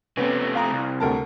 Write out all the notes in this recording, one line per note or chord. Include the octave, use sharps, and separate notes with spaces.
C3 A3 B3 C#4
F5 A#5 D#6
C2
D2 A#4 A5